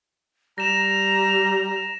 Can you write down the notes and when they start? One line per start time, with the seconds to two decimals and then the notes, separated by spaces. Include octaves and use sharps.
0.58 G3 A#5 A#6 E7